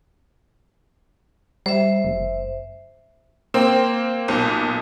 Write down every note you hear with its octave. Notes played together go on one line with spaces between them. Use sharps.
G3 C5 E5
F#1
A#3 C4
B1 A#2